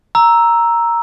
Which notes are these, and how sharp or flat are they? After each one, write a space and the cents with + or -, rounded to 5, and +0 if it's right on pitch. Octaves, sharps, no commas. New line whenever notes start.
A#5 +0 E6 +0